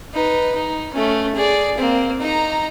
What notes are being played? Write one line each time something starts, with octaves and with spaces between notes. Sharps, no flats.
D#4 B4
D#4
A3 C#4
G#4 D5
A#3 C4
D#4 A#5